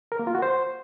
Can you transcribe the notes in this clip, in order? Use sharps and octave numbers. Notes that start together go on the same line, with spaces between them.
A#4
A#3
F4
F#4
C5